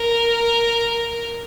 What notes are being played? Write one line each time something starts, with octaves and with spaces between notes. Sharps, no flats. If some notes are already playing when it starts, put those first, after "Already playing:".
Already playing: A#4